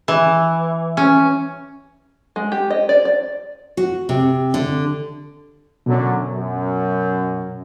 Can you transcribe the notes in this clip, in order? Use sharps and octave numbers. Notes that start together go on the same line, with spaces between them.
E3
C#4
G#3
G4
D#5
D5
D5
F#4
C3
D3
F#2 B2 D3 F#3
F#2